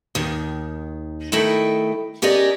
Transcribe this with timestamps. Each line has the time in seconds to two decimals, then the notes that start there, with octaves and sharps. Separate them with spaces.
0.15 D#2 D#3
1.32 D#3 A3 E4 A4 D#5 G5
2.22 C#4 G4 G#4 A#4 D5 D#5